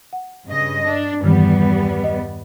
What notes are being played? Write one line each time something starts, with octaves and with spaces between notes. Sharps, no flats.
F#5
G2 C#3 D#5
D4
E2 G2 D#3 E3 G3 B3
D#5